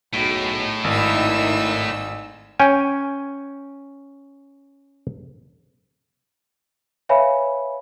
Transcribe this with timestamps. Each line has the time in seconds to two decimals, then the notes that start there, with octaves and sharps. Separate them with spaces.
0.14 B1 A2 D#4 G#4
0.84 G#1 D#3 D#4 E4 E6
2.59 C#4 G5 G#5
7.09 B4 C#5 E5 F5 G#5 B5